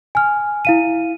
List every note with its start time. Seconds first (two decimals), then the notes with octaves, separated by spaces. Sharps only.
0.15 G#5 F6
0.65 E4 F5 D#7